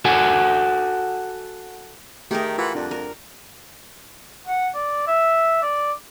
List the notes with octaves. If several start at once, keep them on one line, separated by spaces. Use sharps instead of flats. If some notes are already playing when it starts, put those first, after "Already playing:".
F#4 A4 F#5 G#5
D#3 A3 G4 G#4 A#4
E3 F4 F#5
F2 D4
A#4
F#5
D5
E5
D5